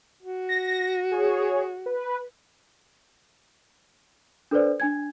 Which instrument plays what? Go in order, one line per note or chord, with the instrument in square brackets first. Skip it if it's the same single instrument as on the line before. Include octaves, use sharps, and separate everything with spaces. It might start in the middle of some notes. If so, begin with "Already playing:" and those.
[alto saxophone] F#4
[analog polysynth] A#6
G#4 C#5
B4
[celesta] D4 A4 B4 C5 D5
D4 G#5 G#6